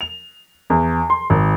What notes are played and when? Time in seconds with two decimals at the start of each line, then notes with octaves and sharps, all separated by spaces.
0.01 F7
0.70 E2
1.10 C6
1.30 G#1